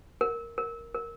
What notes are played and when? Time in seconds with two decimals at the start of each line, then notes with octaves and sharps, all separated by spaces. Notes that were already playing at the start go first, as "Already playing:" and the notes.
0.21 A#4
0.58 A#4
0.95 A#4